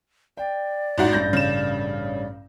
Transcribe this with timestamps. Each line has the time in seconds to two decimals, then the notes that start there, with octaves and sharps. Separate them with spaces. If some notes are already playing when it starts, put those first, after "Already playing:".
0.37 D5 G5
0.98 A1 G#2 F#4
1.13 A1 G2 G6 A#6
1.33 C#3 E7